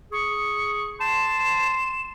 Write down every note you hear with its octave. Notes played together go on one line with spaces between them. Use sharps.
G#4 C#6
A5 C6 E7